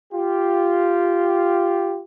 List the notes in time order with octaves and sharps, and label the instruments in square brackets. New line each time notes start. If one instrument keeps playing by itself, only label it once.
[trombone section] F4 G4